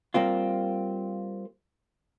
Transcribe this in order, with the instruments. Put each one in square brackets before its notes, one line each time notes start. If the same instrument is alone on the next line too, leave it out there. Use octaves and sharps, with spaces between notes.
[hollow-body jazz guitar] G3 A#3 C4 F4